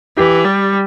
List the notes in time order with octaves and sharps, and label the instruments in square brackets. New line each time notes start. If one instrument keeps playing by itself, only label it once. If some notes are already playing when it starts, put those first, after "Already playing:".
[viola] E3 [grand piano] G4
[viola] G3